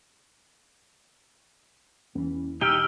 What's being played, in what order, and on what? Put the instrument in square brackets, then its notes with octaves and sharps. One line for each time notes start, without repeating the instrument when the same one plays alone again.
[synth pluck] E2 E3 [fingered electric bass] A#3 C#4
[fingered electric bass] B2 [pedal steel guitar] D#4 G4 G5 [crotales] E6 F6 G7